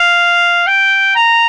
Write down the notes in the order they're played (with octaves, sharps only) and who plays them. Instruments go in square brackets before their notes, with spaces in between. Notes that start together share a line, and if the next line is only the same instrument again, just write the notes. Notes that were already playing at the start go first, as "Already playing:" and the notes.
Already playing: [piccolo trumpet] F5
G5
A#5